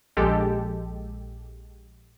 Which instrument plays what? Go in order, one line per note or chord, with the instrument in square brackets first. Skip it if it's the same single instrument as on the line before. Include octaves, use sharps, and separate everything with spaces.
[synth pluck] A#1 G#3 G4 A4